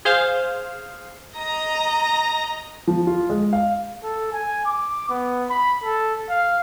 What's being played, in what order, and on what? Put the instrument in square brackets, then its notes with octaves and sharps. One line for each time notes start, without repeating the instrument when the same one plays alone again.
[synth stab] G#4 C5 F5
[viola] D#5 A#5
[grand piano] F3
F4
G#3
F5
[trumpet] A4
G#5
D6
B3
B5
A4
F5